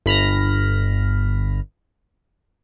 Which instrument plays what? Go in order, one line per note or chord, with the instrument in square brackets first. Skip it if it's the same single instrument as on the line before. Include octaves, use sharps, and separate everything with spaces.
[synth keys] G1 B5 F6 A#6